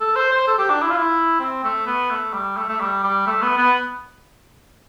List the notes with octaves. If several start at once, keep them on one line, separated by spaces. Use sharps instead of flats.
A4
C5
C5
A4
G4
D4
E4
F4
E4
C4
A3
B3
A3
G3
A3
A3
G3
G3
A3
B3
B3